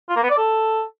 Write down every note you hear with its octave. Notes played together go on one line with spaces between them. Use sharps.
F4
A#3
B3
D5
A4